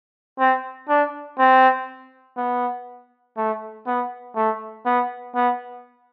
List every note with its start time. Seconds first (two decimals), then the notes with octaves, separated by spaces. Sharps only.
0.39 C4
0.89 D4
1.39 C4
2.37 B3
3.37 A3
3.87 B3
4.36 A3
4.86 B3
5.35 B3